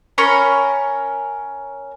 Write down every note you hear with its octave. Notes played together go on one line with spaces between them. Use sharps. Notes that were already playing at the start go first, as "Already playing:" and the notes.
C#4 A#4 B5 C#6